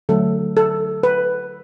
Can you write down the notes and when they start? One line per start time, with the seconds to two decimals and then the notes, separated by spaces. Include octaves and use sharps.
0.09 D3 F#3 A3 A4
0.57 A4
1.03 B4